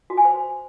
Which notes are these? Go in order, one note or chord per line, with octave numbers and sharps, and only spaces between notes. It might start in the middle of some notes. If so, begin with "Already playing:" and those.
F#4
G#5
C5